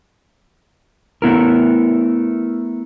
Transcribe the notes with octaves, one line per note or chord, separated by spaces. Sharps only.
A3 B3 E4 A#4